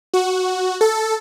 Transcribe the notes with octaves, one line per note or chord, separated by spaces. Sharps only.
F#4
A4